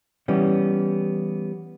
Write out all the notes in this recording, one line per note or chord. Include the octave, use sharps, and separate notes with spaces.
E3 G3 B3 C#4